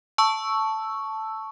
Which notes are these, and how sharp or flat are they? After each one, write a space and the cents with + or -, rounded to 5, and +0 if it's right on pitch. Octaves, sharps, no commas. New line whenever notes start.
A5 +0 C#6 +0 E6 +0